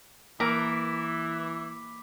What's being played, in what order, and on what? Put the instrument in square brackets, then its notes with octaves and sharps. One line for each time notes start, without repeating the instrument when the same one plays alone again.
[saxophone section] E3 [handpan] A#3 [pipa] A#4 [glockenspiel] B5 D6 B6